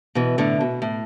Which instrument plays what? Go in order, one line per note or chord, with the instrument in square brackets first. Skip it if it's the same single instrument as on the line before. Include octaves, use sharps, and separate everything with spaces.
[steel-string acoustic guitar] B2 E3
A2 D3
B2
A2